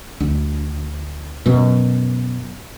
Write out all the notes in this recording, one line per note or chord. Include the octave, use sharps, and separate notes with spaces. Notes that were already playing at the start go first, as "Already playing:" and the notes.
D2
F#2 B2